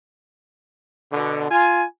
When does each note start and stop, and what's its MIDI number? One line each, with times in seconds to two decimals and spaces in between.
1.12 1.49 47
1.12 1.49 50
1.51 1.85 65
1.51 1.85 80